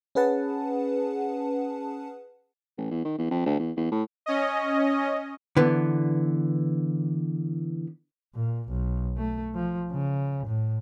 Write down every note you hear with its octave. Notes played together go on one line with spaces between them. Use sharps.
C#4 G#4 B4 F#5 A5
A1
E2
D#3
E2
F2
D2
E2
E2
A2
C#4 D#5
D3 E3 B3
A#2
B1
A3
F3
C#3
A2